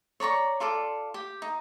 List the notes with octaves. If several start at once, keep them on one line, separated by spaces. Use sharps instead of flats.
C#5 D5 A#5 C#6
F4 A4 D5 D6
G4
D#4